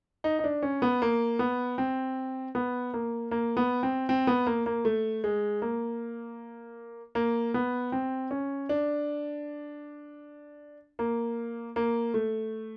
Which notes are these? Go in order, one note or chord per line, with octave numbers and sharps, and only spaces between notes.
D#4
D#4
D4
C#4
B3
A#3
B3
C4
B3
A#3
A#3
B3
C4
C4
B3
A#3
A#3
A3
G#3
A#3
A#3
B3
C4
C#4
D4
A#3
A#3
A3